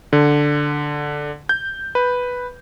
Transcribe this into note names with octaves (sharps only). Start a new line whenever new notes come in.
D3
G6
B4